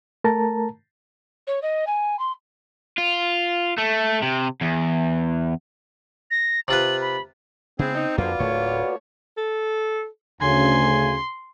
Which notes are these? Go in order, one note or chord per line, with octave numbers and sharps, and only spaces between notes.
A3 A#4 A5 A#5
C#5
D#5
G#5
C6
F4
A3
C3
E2
A#6
C3 F4 B4 F#7
B5
C#3 G#3 B3 C4 E4 G#4
D#4
F2 D3 F3 A#3 F4 F#4 B4 D5
D1 A2 D3 A3 A#3 C#5
A4
D2 C#3 G#5 C6